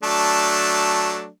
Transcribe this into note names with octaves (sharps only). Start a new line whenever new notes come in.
F#3 A3 D4